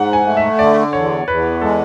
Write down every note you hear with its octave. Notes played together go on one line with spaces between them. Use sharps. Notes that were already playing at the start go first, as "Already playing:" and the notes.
Already playing: G#2 F#5
G#5
A3
E5
D3 D5
E2 C#5
E2 B4
G#3 A4